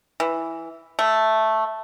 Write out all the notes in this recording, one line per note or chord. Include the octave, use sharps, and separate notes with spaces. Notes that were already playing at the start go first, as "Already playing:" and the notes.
E3
A3